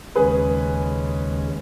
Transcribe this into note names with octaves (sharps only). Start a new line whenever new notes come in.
D#2 C#3 G#3 C#4 G#4 B4